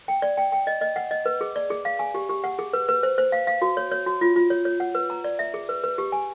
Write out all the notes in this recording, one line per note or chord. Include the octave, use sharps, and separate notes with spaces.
G5
D5
G5
G5
D#5
D#5
F#5
D#5
B4
G#4
D5
G#4
F5
G#5
G4
G4
F#5
G#4
B4
B4
C5
C5
F5
F5
F#4
C#5
C#5
F#4
F4
F4
C#5
C#5
F#5
B4
A#5
D5
E5
G#4
B4
B4
G4
G#5